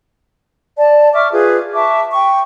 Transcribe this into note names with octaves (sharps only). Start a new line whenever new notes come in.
D5 A5
E5 C#6 D6 F6
F4 G#4 B4
E5 A5 C#6 D6
G5 C#6